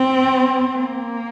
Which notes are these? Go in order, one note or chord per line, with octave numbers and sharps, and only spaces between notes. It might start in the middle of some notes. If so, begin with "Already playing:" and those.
Already playing: C4
A#3